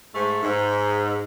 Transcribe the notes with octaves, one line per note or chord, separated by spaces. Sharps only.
G#2 A3
G#2